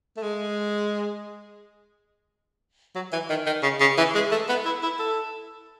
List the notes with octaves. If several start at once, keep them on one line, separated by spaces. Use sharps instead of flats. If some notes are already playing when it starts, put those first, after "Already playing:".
A3
G#3
F#3
E3
D#3
D#3
C#3
C#3
E3
G#3
A3
B3
E4
E4
A4